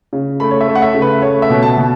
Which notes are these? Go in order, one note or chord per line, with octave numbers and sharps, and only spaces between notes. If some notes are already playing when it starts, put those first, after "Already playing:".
C#3
A3 B5
C#5
E5
A3
F#5
E5
C#3
B4
A3 C#5
E5
B2
A5
B2